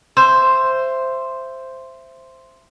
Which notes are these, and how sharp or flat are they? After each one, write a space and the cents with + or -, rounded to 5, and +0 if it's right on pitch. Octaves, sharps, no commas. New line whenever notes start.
C5 +0 E5 +20